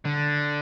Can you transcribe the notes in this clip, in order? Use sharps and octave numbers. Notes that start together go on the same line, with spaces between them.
D3